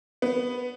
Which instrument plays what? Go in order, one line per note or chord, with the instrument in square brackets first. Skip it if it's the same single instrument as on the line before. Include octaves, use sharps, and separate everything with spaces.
[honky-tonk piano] B3